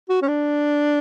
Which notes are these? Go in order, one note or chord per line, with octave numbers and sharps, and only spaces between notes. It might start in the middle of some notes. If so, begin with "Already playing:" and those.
F#4
C#4
D4